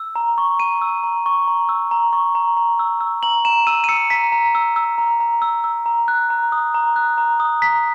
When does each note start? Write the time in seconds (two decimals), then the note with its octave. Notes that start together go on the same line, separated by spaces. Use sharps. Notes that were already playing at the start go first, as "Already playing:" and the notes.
Already playing: E6
0.16 A#5
0.38 C#6
0.60 A#5 D#7
0.82 E6
1.04 A#5
1.26 C#6
1.48 A#5
1.69 E6
1.91 A#5
2.13 C#6
2.35 A#5
2.57 A#5
2.79 E6
3.01 E6
3.23 A#5 F#7
3.45 A#5 E7
3.67 E6 D#7
3.84 D#7
3.89 E6 C#7
4.10 A#5 B6
4.32 A#5
4.55 E6
4.76 E6
4.98 A#5
5.20 A#5
5.42 E6
5.64 E6
5.86 A#5
6.08 F#6
6.30 A#5
6.52 D#6
6.74 A#5
6.96 F#6
7.18 A#5
7.40 D#6
7.62 A#5 B6